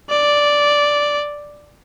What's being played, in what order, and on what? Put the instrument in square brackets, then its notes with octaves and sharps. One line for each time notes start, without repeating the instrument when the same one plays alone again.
[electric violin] D5